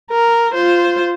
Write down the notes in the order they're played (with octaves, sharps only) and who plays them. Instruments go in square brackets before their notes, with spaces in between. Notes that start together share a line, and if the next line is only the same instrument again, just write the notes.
[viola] A#4
F4 C5